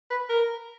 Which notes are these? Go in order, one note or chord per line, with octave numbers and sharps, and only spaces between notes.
B4
A#4